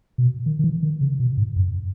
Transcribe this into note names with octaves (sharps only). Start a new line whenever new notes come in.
B2
D#3
D#3
E3
D#3
C#3
B2
G#2
F#2